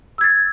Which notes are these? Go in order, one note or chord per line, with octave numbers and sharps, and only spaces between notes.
E6 G#6 A6